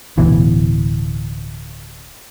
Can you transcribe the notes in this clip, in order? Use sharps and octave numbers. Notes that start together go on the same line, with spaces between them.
D1 B2 E3